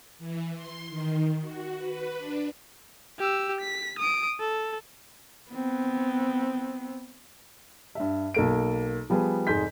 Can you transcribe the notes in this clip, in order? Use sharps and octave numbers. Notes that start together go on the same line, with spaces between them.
E3
C6
D#3
F#4
B4
D4
G4 E6
B6
D#6 D7
A4
B3 C4
G2 E5
B1 A#3 D7
F3 G3 B3 G#4
F1 G#2 G#4 C6 G6 B6